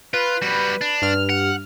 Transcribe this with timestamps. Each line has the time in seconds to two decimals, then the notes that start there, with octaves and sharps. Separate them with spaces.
0.14 F4 B4
0.42 G3 F#4
0.81 D4
1.02 G2 F6
1.29 F#5